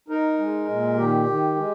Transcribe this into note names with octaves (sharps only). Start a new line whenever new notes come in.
D#4 A#4
G#3
A#2
D#3 G4
D#3
G#3